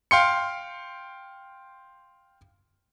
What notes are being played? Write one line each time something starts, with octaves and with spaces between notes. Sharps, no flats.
F5 G5 C6 C#7